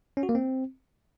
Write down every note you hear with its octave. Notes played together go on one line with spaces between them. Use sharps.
C#4
F#4
A#3
C4